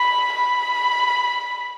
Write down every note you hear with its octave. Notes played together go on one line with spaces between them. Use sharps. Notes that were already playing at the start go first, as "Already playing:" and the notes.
Already playing: B5
B5